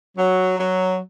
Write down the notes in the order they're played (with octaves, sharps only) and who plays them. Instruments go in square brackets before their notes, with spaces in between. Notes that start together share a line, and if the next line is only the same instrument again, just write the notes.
[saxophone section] F#3
F#3